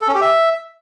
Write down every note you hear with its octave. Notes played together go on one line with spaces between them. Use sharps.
A4
C#4
G4
E5